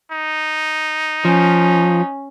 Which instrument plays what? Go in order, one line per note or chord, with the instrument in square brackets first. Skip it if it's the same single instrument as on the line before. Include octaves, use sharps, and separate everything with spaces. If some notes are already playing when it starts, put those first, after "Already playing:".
[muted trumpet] D#4
[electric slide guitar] F3 [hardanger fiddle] C#4